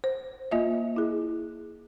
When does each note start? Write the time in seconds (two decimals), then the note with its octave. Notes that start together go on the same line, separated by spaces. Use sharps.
0.04 C5
0.51 A#3 F4 D#5 E5
0.96 E4 G#4